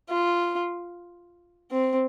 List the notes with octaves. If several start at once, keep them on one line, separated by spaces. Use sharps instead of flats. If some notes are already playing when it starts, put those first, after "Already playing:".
F4
C4